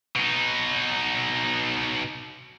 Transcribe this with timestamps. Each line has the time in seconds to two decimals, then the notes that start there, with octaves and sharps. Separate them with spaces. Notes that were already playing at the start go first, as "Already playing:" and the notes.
0.16 B2 D#4